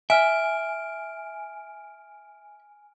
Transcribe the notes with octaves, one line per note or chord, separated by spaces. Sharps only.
E5 G#5 F6 D7